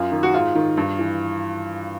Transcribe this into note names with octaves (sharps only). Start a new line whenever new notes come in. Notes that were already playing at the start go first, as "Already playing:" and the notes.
Already playing: F#2 F4
D#3
F#4
G#2 F4
D#3
G2
E3